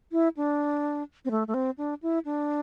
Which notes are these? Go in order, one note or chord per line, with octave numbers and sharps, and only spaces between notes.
E4
D4
C4
A3
A3
C4
D4
E4
D4